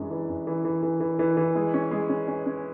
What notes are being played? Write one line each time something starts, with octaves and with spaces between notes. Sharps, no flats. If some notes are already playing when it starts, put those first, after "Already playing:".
Already playing: F#2 E3 G#3 D4
E3
F#2
E3
E3
E3
E3
E3
E3
G#3
C#4
G#3
C#4
C#4
C#4